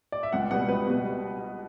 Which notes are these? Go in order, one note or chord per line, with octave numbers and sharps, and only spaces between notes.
D5
E5
C#2 F#5
B2 G3 B3 F#5
C#2 B4
B2 G3 B3